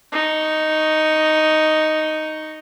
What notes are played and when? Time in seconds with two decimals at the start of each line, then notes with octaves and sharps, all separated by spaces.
0.12 D#4 C#6